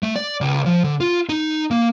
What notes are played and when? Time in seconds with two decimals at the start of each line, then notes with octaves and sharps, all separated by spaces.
0.03 A3
0.16 D5
0.41 C#2
0.66 F3
0.84 D3
1.00 F4
1.29 D#4
1.71 A#3